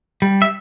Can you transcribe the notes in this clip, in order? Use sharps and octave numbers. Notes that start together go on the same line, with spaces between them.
G3
E5